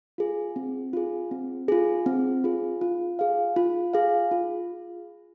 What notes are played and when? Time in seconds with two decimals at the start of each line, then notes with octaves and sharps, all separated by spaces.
0.18 F4 G#4
0.56 C4
0.93 F4 G#4
1.31 C4
1.68 F4 G#4
2.06 C4
2.44 F4 G#4
2.81 F4
3.19 G#4 F5
3.56 F4
3.93 G#4 F5
4.31 F4